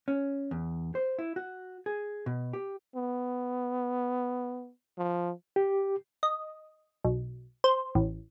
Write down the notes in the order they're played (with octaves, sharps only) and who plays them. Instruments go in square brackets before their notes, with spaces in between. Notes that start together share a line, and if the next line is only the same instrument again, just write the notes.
[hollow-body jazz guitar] C#4
E2
C5
E4
F#4
G#4
B2
G4
[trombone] B3
F3
[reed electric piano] G4
[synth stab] D#5
B1
C5
A1